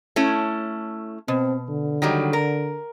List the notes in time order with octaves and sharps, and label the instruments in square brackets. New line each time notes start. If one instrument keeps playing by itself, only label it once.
[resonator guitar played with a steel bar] A3 C#4 E4
[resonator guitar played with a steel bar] B2 [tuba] C4
[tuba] D3
[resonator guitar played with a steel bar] D#3 F#3 G3
A#4